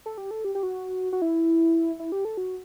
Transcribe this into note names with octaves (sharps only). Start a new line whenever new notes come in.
A4
G4
A4
G4
G4
F#4
F#4
E4
E4
G4
A4
F#4